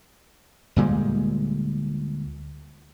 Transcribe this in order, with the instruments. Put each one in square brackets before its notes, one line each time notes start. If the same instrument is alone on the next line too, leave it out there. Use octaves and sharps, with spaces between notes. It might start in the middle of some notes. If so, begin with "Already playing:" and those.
[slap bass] D2 A#2 G3 G#3